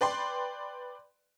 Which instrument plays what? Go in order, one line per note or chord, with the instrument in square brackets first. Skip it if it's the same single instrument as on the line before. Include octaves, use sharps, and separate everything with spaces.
[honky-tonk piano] B4 D5 G5 C6